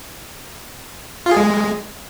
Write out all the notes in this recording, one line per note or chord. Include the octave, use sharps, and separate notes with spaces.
F4
G#4
G#3